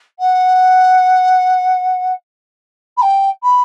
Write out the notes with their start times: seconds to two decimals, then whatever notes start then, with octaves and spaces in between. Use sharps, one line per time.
0.19 F#5
2.97 B5
3.02 G5
3.43 B5